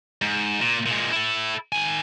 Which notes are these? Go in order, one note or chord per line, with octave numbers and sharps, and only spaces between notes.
G#2
A#2
A#2 G#3
E4 A4
D#3 G#5